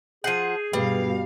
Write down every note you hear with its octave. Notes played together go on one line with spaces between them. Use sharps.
F3 G#4 F#5 G6 C7 D#7
G2 B2 G3 B4 F5